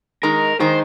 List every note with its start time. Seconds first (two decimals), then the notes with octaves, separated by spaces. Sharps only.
0.23 D#3 G#3 D#4 A#4
0.60 D#3 G#3 D#4 C5